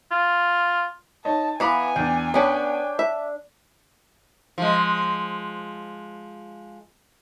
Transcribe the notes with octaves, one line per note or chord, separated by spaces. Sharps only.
F4
D#4 C#5 D#5 A5
E3 B3 B4 F5 G#5 A#5 D6
E2 D4 G5
B3 C#4 D4 B4 C#5 G5
E5
F3 G#3